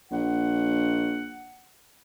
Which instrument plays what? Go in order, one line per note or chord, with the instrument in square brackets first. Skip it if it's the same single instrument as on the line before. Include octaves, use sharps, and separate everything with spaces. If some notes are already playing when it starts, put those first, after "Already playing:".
[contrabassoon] A#1 [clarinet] F#5